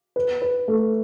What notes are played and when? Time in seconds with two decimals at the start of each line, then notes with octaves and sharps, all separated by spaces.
0.16 B4
0.42 B4
0.68 A3